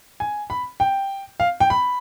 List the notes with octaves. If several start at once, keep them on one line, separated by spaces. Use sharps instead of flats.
G#5
B5
G5
F5
G5
B5